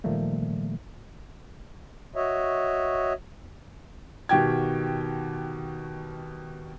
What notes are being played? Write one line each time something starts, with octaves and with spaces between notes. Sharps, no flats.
A#2 D#3 F3 G3 A3 A#3
F#4 C#5 D#5 E5
B2 D#3 F#4 G4 G5 G#6